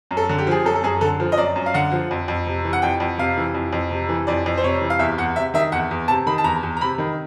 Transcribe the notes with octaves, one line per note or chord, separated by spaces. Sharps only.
F#2
A4
D3
G4
F3 G#4
F#2 A4
A4
F#2 G#4
D3 A4
F3
D#5
F#2 D5
F#2
F5
D3 F#5
F3
F2
F2
C3
E3
F#5
F2 G5
F2
C3 F5
E3
F2
F2
C3
E3
F2 D5
F2
C5
C3 C#5
E3
F5
E2 E5
E2 F#5
C3 E5
D#3 E5
E2 F#5
E2
C3 A5
D#3 B5
A5
E2 A#5
E2
A#5
C3 B5
D#3